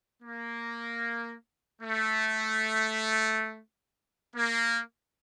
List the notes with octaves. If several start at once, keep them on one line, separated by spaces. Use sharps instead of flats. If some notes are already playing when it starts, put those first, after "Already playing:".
A#3
A3
A#3